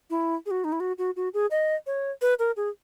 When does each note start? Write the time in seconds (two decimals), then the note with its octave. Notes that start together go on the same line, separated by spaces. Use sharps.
0.10 E4
0.46 G#4
0.51 F#4
0.64 D#4
0.72 E4
0.80 F#4
0.98 F#4
1.16 F#4
1.34 G#4
1.51 D#5
1.87 C#5
2.22 B4
2.39 A#4
2.57 G#4